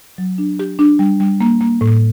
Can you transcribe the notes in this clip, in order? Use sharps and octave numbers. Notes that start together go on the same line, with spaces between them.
F#3
D4
G4
D4
G3
G3
A#3
A#3
A2